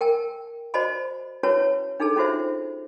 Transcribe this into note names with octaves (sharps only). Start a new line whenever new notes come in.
A#4 G5 A5
F#4 C5 D5 D#5 A5 B5
C#4 E4 F#4 B4 C#5 A5
D4 D#4 G#4 A4 A5
C#4 D#4 F4 F#4 C5 E5